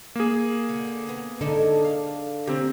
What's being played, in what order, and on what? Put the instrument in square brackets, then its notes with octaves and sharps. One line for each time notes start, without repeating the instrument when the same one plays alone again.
[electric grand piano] A#3 G#4
[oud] D3
B3
[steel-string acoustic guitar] D3 [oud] G#3 D#4 A4
[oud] F5
[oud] A#3 C#4 [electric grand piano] C4 G4